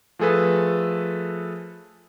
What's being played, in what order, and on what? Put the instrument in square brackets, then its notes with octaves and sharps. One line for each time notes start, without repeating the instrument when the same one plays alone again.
[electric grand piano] F3 A3 G#4 A4 B4